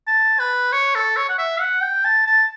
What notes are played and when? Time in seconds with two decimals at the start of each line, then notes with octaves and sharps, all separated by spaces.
0.08 A5
0.40 B4
0.73 C#5
0.95 A4
1.17 C#5
1.29 F#5
1.38 E5
1.61 F#5
1.82 G5
2.05 A5
2.27 A5